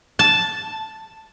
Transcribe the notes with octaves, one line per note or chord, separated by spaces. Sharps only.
A5